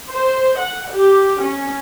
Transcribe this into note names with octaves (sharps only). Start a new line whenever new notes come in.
C5
F#5
G4
C#4